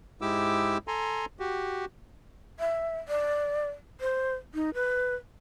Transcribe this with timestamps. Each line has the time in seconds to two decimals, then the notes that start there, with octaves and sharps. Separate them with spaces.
0.21 G#2 G#3 E4 G4 D6 E6
0.88 A4 G#5 A#5 C6
1.39 F#4 G4
2.60 E5
3.08 D5
4.01 C5
4.54 D#4
4.74 B4